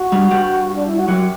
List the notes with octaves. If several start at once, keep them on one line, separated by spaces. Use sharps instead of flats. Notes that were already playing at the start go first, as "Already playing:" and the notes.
Already playing: F#4
G2 G3
G2 G3
D4
E4
F#4
F#2 F#3 G4